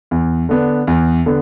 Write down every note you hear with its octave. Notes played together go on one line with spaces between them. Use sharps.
E2
D3 B3 D4
E2
D3 B3